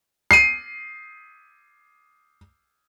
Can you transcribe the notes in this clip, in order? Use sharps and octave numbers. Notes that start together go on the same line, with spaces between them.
C7 D#7